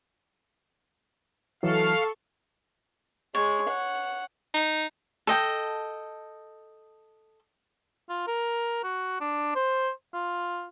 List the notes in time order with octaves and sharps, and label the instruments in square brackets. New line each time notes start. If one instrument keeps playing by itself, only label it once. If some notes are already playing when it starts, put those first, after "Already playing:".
[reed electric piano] E3 F#3 [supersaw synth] A4 C#6 [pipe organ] F5
[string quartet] G#3 [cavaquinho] C#5
[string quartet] F#5
[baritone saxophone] D#4
[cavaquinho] A4 D#5 G5
[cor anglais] F4
A#4
F#4
D4
C5
F4